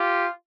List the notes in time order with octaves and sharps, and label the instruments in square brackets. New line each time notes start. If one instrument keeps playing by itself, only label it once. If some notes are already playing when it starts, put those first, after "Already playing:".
Already playing: [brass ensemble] F4 G4